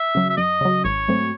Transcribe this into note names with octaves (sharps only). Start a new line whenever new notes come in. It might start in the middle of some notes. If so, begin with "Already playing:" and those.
Already playing: E5
C#3 F#3
E5
F#2 D#5
C#3 F#3
G#1 C#5
G#2 F#3 A3 C4